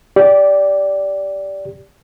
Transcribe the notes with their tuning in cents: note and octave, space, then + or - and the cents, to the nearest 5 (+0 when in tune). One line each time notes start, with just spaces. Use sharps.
G4 +0 D5 -15